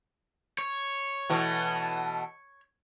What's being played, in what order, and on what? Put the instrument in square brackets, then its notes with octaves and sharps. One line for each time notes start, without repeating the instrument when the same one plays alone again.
[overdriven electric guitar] C#5
[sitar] B2 E3 A3